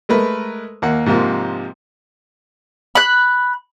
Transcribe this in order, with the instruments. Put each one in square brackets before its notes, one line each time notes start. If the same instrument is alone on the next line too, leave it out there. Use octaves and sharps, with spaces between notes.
[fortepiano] G#3 A3 A#4 B4
D#2 A#3 F#5
G#2 C3 F3 A#3
[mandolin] B5 F#6